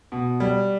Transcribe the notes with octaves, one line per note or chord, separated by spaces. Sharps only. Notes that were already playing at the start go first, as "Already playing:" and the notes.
B2
G3